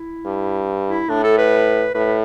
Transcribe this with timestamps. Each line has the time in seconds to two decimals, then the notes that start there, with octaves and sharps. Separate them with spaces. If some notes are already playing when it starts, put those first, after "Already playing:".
Already playing: E4
0.26 G2
0.89 E4
1.09 A2 D4
1.24 A4
1.38 B4
1.94 A2 B4